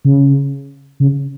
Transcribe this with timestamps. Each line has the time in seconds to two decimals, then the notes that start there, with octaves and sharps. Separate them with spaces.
0.05 C#3
1.00 C#3